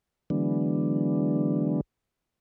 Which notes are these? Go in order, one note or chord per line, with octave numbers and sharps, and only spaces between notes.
D3 E3 F#3 G#3 B3 D4